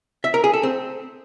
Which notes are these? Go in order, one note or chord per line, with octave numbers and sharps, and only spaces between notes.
E5
A#4
G#4
A4
C4